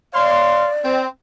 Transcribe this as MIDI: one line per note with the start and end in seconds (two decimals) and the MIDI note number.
0.14 0.71 73
0.14 1.00 74
0.14 0.71 77
0.14 0.71 84
0.84 1.07 60